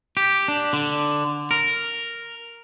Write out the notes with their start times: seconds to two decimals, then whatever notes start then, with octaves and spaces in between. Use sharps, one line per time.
0.17 G4
0.48 D4
0.73 D3
1.51 A#4